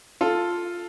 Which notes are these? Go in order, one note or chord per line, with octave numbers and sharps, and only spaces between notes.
F4 A4